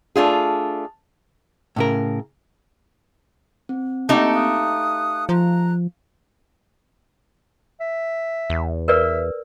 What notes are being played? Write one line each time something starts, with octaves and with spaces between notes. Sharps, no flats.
A3 D4 F4 G#4
A2 C#3 A#4
C4
A3 A#3 C4 D#4 G4 F#5 A5
F5 D#6 F#6
F3 A#5 F#6
E5
E2
A#4 B4 D5 E5